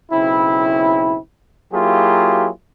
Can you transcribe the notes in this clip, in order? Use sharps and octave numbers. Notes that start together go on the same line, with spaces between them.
B1 C#3 C4 E4
F#3 A#3 E4 F4 G4 G#4